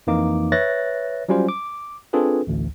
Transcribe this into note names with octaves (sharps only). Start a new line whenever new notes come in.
F2 E3 A#3 D#4 D6
B4 C#5 E5 F#6 A6 A#6
F#3 G3 C#4 F4 C5
D6
C4 D4 F4 G#4 A4 B4
A1 D2